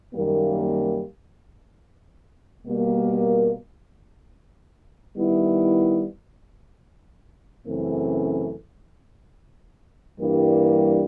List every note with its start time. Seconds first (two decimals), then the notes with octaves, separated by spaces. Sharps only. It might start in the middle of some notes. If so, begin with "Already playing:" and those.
0.14 F#2 D#3 G3 A#3
2.66 B2 G3 A#3
5.17 D#3 G3 B3 E4
7.67 F#2 C#3 E3 A3 C4
10.18 G2 E3 G3 A#3 D4